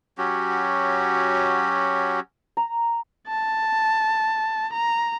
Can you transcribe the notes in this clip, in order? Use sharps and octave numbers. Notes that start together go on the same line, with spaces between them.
F#3 C#4 F#4 G4
A#5
A5
A#5